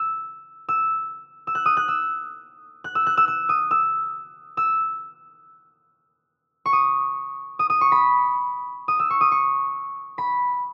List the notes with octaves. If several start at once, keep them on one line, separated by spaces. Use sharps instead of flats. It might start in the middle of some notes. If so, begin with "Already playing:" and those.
Already playing: E6
E6
E6
F#6
D#6
F#6
E6
F#6
E6
F#6
E6
E6
D#6
E6
E6
C#6
D#6
D#6
D#6
C#6
B5
D#6
E6
C#6
D#6
C#6
B5